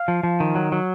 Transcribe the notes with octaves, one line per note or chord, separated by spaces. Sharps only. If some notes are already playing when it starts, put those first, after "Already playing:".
Already playing: F5
F3
F3
D#3
F#3
F#3